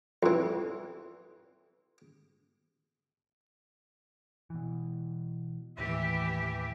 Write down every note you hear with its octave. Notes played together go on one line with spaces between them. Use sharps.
F2 E3
B2 E3
D#2 A2 E3 G4 E5